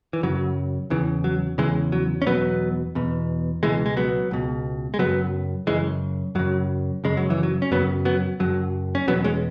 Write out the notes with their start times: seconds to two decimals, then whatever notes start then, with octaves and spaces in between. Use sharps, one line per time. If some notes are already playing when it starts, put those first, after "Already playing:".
0.13 E3
0.23 F#2 C#3 F#3
0.90 E2 C#3 E3
1.24 F#3
1.58 E2 C#3 E3 G#3
1.92 F#3
2.22 C#4
2.27 E2 B2 F#3 B3
2.95 E2 B2
3.63 C#2 B2 E3 G#3
3.86 G#3
3.97 F#3 B3
4.31 C#2 B2
4.94 G#3
4.99 F#2 C#3 F#3 B3
5.67 F#2 C#3 E3 G#3
6.35 F#2 C#3 F#3
7.04 F#2 C#3 G#3
7.17 F#3
7.30 E3
7.43 F#3
7.62 C#4
7.71 F#2 C#3 F#3 B3
8.05 F#3 B3
8.40 F#2 C#3 F#3
8.95 C#4
9.07 E2 B2 F#3 B3
9.24 G#3 C#4